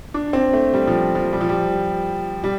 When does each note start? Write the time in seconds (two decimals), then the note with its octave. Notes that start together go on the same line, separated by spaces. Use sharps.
0.14 D4
0.33 C4
0.53 A3
0.74 G3
0.87 F3
1.15 F3
1.33 G3
1.41 F3
1.49 G3
2.44 G3